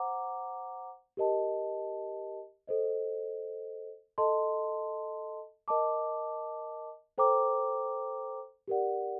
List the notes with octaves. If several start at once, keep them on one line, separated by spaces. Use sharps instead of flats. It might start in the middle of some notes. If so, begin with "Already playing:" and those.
Already playing: C5 F#5 A#5 D6
G4 A#4 D#5 A5
A4 C5 D#5
A4 D#5 A5 C6
A#4 D#5 A5 D6
A4 C5 G5 A#5 D6
G4 A#4 D5 F#5